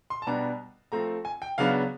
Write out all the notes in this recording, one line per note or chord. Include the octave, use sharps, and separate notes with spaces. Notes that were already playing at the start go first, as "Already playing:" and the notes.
C6
A5
B2 G3 B3 D4 A#5
F3 A3 C4 A#5
G#5
G5
C#3 F#3 B3 D4 F5